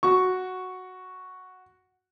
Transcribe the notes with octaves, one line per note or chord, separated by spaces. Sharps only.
F#4 C#6